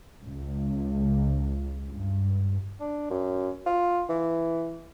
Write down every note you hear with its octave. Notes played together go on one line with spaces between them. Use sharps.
C#2
G2
D4
F#2
F4
E3